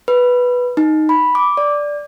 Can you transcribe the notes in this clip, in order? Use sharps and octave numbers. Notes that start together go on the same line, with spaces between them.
B4
D#4
B5
D6
D5